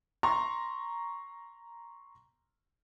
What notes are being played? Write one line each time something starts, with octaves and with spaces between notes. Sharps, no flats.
A#5 C6 C#6